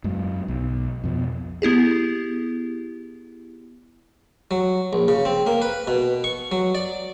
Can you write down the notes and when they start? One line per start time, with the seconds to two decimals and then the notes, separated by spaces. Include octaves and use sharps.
0.04 F#2 G#3
0.48 B1
1.04 F2 B2
1.62 B3 E4 G4 G#4
4.51 F#3
4.93 A#1
5.08 C#3
5.25 C4
5.46 A#3
5.62 B4
5.87 B2
6.24 C#6
6.52 F#3
6.75 D5